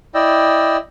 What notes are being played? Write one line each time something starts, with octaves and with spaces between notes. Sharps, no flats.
E4 D5 D#5 G5 E6